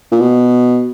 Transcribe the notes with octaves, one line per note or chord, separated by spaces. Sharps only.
A#2
B2